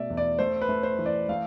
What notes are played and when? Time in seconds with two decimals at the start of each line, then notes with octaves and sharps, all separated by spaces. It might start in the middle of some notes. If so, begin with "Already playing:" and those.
Already playing: B2 A3 D5 E5
0.10 E2
0.17 D5
0.39 A3 C5
0.61 B4
0.69 A3
0.83 C5
0.99 E3
1.06 D5
1.29 A3 F5